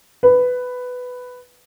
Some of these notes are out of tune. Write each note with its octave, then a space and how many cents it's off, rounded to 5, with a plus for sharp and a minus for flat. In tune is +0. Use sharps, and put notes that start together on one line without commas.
B4 +10